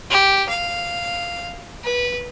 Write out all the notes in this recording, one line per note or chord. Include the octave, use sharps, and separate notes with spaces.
G4
F5
B4